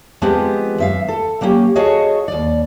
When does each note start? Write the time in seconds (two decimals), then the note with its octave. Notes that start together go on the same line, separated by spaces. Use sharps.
0.22 F3 G#3 B3 C4 G4
0.78 F#2 E5 F5
1.08 A4
1.41 F#3 A#3 C#4 F4 G4
1.75 F#4 G#4 A4 C#5 D#5 F5
2.28 D#2 D5